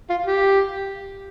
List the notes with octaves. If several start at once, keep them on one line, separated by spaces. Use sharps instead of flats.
F4
G4